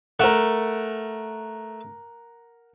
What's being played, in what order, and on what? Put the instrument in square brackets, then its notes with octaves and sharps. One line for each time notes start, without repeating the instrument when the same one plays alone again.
[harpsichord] A3 [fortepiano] A#4 F#5